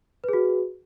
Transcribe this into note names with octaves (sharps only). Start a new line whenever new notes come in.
F#4 G#4 B4